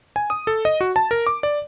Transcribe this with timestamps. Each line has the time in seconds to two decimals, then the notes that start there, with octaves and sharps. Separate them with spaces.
0.16 G#5
0.30 D#6
0.47 A4
0.65 D#5
0.81 F#4
0.96 A5
1.11 A#4
1.27 D6
1.43 D5